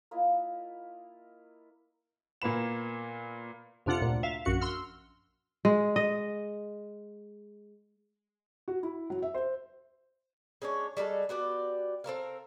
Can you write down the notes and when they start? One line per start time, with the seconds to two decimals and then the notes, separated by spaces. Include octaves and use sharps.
0.11 A#3 E4 F4 D#5
2.42 A#2 A#3 B3 B5 E7
3.86 F2 C3 D4 F4 F#5 C#7
4.00 D2 A#2
4.23 E5 F5
4.45 A#1 F#2 F#4 C#7
4.61 C6 E6 F6
5.65 G#3
5.96 D#5
8.68 F#4
8.83 E4
9.10 F#3
9.22 E5
9.35 C5
10.62 G#3 C#4 D4 C#5
10.97 G3 G#3 D#4 A4
11.29 B3 F#4 G4 D5
12.04 C4 A4 A#4 F5